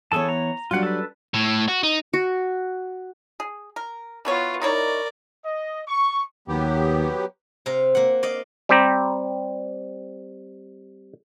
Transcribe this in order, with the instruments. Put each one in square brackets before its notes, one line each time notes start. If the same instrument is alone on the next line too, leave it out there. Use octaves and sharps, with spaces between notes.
[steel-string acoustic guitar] E3 B3 C#5 [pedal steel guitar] G#4 A4 A5
[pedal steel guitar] A#5
[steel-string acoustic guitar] F#3 G3 D4 [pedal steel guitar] F4 F#5
[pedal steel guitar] A4 B4
[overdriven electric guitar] A2
F#4
D#4
[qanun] F#4
[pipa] G#4
A#4
[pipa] E3 F#3 C#5 [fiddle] B3 F4
[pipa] D#4 E4 C#5 [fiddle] A#4 D5
[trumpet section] D#5
C#6
[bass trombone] D#2 [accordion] F#3 B3 G4
[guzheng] C3 F5 A#5
A#3 F#5
D5 D#5 F5
[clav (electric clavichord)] G3 C4 G4 A#5